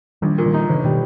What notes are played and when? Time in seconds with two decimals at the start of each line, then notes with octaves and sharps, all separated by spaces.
0.22 A#1 D#3 G3
0.38 A#2
0.46 D#3 G3
0.54 D#4
0.68 G1 C#3 E3
0.84 B2 D#3 G3